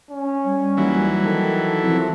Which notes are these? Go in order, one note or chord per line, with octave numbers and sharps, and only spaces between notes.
C#4
G3
D#2 E3 F#3
D#3 A4
C2 F3